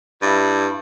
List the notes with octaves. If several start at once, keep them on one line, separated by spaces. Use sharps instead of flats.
G2 E4